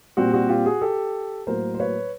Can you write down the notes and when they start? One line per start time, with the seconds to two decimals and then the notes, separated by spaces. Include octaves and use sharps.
0.17 A#2 G3 C4 F#4
0.34 F#4
0.49 F4 G4
0.66 F#4 G#4
0.81 G4 A4
1.47 A2 F#3 A#3 A#4 C5
1.74 C5
1.80 B4 C#5